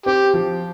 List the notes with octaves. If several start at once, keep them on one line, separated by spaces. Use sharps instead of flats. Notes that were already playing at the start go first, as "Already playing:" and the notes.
C4 G4
F3